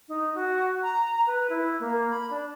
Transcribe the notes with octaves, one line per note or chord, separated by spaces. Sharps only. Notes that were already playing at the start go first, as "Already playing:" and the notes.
D#4
F#4
A#5
B4
E4
A#3
B5
D4